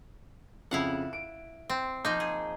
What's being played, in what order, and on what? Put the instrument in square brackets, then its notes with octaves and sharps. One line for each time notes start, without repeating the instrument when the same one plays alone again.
[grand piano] F2 C#3 [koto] E4 F5 F#5
[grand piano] D7
[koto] C4
[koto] F3 A#3 D#4 [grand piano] G6
[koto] G#4